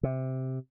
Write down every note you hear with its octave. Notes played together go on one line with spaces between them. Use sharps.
C3